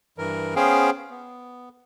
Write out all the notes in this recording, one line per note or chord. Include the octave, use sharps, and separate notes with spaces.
G2 E3 A#4
B3 C#4 G#4 C5 F5 G5
B3